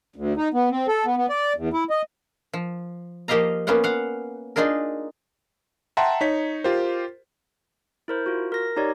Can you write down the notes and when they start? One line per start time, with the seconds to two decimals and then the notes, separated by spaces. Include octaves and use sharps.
0.16 D2
0.37 D#4
0.54 B3
0.71 C4
0.88 A4
1.05 B3
1.17 B3
1.29 D5
1.56 E2
1.73 E4
1.90 D#5
2.53 F3
3.28 F3 A#3 G4 D#5 F5 A#5
3.67 A#3 B3 C#4 F4 F#5
3.84 F5 F#5
4.56 D4 D#4 F4 G#4 A#4
5.97 E5 F#5 G5 A5 A#5 C6
6.21 D#4 C#5 B6
6.64 F4 G4 A#4 C5
8.08 E4 A#4 C5
8.26 F4 F#4
8.52 A#4 A#6
8.77 D#4 G4 C#5 D5